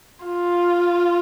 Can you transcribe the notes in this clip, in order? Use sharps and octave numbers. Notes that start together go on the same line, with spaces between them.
F4